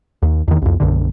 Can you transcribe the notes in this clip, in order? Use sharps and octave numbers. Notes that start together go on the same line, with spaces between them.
D#2
E2 D#3
C2 F2
B1 F#2 D3